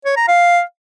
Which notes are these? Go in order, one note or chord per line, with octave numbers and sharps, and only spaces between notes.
C#5
A#5
F5